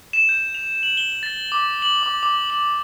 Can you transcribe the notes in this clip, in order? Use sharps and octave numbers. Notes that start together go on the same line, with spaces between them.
E7
G6
F7
F#7
G7
A6
D6
F#7
D6
D6
F#7